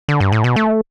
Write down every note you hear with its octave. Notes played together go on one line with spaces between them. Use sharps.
D3
G2
A2
B2
A3